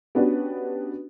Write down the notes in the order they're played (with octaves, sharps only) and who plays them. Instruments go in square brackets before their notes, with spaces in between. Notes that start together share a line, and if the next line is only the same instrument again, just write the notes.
[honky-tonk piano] B3 C#4 D4 F#4 G4 B4